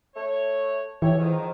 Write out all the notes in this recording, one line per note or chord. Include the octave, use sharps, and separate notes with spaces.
A3 C#5
E3 G4 A4 C#5
F2 G#2 D#3